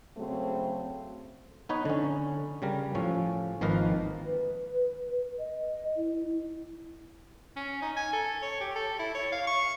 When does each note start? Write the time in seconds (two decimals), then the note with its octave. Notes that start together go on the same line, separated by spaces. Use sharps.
0.17 C#3 F#3 A3 C4
1.69 B3 D#4 B4 C#5
1.85 D3 C#4
2.62 C#3 G3 A#4
2.95 A2 F3 C#4
3.61 G#1 F3 A#3 D#4 A#4 B4
4.26 B4
5.39 D#5
5.97 E4
7.56 C#4
7.82 D#4
7.96 G#5
8.13 A4
8.42 C#5
8.61 G4
8.75 A4
8.99 E4
9.14 C#5
9.32 F5
9.47 C#6